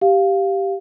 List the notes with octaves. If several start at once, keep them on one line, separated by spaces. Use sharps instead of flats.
G4 F5